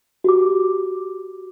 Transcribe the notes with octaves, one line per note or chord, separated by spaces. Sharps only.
F#4 G4 D6